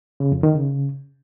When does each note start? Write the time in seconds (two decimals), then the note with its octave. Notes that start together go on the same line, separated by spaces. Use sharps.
0.20 C#3
0.32 F2
0.43 D#3
0.55 C#3